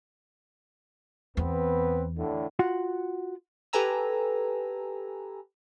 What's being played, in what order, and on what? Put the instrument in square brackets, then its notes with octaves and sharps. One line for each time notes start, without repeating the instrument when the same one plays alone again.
[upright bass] E2 [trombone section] B3 C4 B4
[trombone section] A2 D3
[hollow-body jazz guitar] F4 F#4 F#5
[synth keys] G4 A4 B4 G#5 A#5 E6